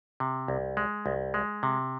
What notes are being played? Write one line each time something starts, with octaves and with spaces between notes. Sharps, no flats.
C3
C2
G#3
C2
G#3
C3